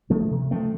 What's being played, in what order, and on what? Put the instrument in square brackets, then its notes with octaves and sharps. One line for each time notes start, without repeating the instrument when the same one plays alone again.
[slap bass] F3 A3 C4
C3
F3 A3 C4